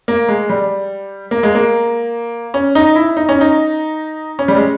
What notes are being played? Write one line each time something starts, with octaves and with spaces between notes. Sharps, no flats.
A#3
G#3
G3
A#3
G#3
A#3
C#4
D#4
E4
D#4
C#4
D#4
C#4
G3
G#3